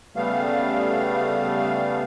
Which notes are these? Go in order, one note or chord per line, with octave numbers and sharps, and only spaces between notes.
C#3 G3 A3 B3 F5